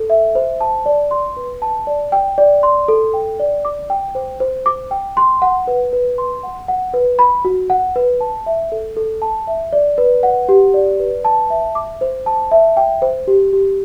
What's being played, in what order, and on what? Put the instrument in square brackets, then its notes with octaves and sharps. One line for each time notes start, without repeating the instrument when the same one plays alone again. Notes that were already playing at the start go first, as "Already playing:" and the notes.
Already playing: [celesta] A4
E5
C5
A5
D5
C6
B4
A5
D5
G5
D5
C6
A4
G5
D5
D6
G5
C5
C5
D6
G5
C6
F#5
B4
B4
C6
F#5
F#5
B4
B5
F#4
F#5
B4
A5
E5
A4
A4
A5
E5
D5
B4
F#5
G4
D5
B4
A5
E5
D6
C5
A5
E5
G5
C5
G4
G4